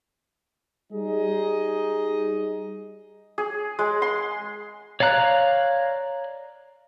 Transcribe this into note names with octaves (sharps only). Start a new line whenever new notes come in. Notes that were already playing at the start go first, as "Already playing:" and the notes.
G3 D#4 G#4 D#5
G#4
G#3
C6
C#5 D5 F5 A#5 F#6